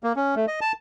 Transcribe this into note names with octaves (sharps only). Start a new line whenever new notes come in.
A#3
C#4
A3
D#5
A5